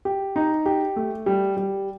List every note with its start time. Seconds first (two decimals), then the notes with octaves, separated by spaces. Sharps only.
0.05 G4
0.36 D#4
0.66 G4
0.96 A3
1.26 G3
1.57 G3